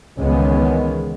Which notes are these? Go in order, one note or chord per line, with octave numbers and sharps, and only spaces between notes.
C#2 D#3 E3 G#3 B3 C#4